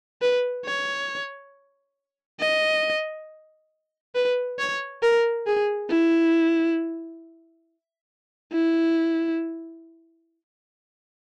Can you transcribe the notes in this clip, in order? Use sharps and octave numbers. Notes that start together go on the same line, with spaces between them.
B4
C#5
D#5
B4
C#5
A#4
G#4
E4
E4